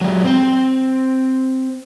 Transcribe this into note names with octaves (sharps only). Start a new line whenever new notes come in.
F#3 G#3
C4 C5